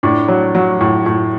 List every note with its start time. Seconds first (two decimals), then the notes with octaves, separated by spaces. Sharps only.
0.03 A2 D4
0.28 F#3
0.55 F#3
0.81 A2
1.06 A2